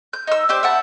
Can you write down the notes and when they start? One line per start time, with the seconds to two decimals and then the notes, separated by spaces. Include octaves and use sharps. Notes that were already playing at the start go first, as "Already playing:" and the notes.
0.13 G6
0.27 D#4 E6
0.49 D4 G4 C5 G6
0.63 E5 F#5 A5 B5